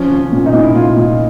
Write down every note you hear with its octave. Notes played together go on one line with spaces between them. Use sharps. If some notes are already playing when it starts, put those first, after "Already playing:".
Already playing: F3 C#4
F3
C#4
A#2
D#4
A#2
E4
A#2 F4
A#2